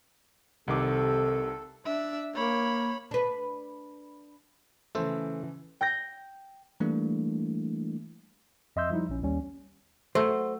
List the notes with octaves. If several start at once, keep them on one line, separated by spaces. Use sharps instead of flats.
C2 C3 D#3 A4 D6
D4 E5
A#3 C#5 B5
D4 B4
C#3 E3 A3 A4 C5
G5 G6 A#6
E3 G3 A3 A#3 D4 E4
F2 D#5 E5 C6 E6 G6
F3 G3 D#4 E4
A#1 C#4
D#2 G3 C#4
F#3 A3 C5